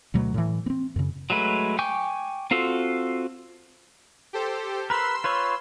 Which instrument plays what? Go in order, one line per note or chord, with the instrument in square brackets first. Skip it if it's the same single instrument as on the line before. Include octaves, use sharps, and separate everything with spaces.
[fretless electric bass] D2 B2 F#3 A3
A2 E3
B3 C4
F#2 C#3
[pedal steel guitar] F#3 G#3 A3 B4
G5 G#5 C#6 D6 G6
C4 F4 F#4 A4
[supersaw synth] G4 A4 C5
[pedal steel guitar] A#4 B4 [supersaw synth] C6 E6
[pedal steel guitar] F4 B4 C#5